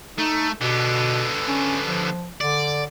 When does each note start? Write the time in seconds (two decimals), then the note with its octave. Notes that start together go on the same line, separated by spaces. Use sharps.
0.18 A3 D#4
0.61 B2 D3 B3
1.48 C#4
1.84 F3
2.40 D3 D5